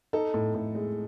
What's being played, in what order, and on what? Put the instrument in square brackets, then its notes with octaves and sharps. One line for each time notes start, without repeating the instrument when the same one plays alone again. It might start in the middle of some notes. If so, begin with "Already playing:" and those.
[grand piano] D#4 A4
A2
A2
G#3